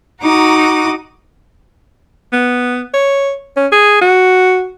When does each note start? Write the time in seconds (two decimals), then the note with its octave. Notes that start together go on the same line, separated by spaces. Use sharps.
0.21 D#4 F#4 A#5 D6 D#6
2.33 B3
2.94 C#5
3.57 C#4
3.72 G#4
4.02 F#4